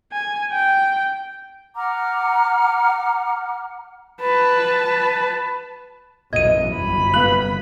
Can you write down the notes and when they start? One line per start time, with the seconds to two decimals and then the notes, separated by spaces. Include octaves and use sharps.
0.13 G#5
0.52 G5
1.76 F#5 A#5 D6 F6
4.21 B4 A5
6.33 B1 F#2 E3 D#5 G#6 D#7
6.77 G1 F#2 C3 B5
7.14 B3 F5 F#6 F#7